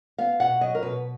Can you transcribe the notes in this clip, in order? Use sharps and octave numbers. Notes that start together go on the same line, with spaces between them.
B3 F5
B2 F#5
F#3 D#5
A#4
B2 B4